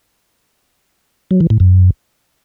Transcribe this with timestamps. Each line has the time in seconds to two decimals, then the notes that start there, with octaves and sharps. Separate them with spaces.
1.31 F#3
1.40 E3
1.50 A2
1.60 F#2